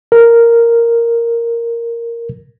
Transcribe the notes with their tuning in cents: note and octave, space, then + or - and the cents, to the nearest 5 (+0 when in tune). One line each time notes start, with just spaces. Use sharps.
A#4 -5